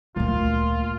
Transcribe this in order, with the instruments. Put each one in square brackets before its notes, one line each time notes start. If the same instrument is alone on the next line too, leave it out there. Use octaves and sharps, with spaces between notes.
[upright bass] D2 A3 [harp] A#2 [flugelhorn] F4